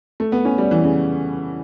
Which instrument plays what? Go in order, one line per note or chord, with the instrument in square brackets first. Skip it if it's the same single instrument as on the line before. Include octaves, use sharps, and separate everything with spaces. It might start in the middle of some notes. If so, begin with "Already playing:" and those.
[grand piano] A3
B3
C#4
G3
E3
C#3